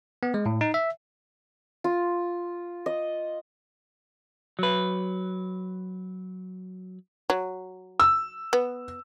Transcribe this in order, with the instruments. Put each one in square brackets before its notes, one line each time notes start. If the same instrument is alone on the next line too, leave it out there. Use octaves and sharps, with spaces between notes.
[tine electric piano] B3
G#3
A2
D#4
E5
[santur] F4
D#5
[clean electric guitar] F#3 B4
[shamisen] F#3
[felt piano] E6
[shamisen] B3